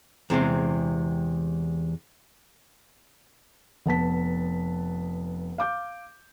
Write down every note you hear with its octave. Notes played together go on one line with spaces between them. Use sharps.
E2 C3 G#3 C4
F1 B3 A5 B6
F5 D6 G6